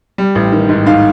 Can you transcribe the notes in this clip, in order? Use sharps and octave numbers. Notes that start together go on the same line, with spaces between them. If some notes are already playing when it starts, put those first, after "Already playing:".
G3
A1
D#3
G#2
G#2 F5